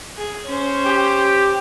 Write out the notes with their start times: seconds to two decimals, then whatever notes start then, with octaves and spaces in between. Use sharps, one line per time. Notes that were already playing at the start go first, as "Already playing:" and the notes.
0.17 G#4
0.46 C#4 C5
0.86 G4